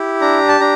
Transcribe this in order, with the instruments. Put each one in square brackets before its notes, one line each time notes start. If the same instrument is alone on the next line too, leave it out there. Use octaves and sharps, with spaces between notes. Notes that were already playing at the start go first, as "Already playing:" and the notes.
Already playing: [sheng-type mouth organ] E4 G4
D4 A#5
A5
D4 A#5